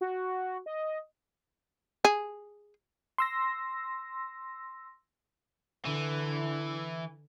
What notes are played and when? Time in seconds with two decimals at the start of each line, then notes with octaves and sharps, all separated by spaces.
0.01 F#4
0.66 D#5
2.05 G#4
3.18 C6 E6 A#6
5.85 D3 E3